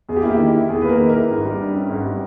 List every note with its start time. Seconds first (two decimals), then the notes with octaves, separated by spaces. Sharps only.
0.09 E2 G#4
0.16 G4
0.23 A#3 E4
0.31 G4
0.39 D#3
0.54 E4
0.69 E2 G#4
0.81 B4
0.84 A#3
0.89 A#4
0.99 D#3
1.09 A#4
1.14 E4
1.30 G#1
1.45 G3
1.60 G2
1.75 C#4
1.90 G#1
2.05 G3